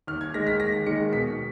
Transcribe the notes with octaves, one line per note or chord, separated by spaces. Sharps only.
D#2 F6
G#6
D#3 G#3 A#6
B6
D#2 A#6
D#3 G#3 C#7
B2 B6